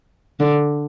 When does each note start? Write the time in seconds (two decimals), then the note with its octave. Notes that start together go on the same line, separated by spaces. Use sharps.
0.40 D3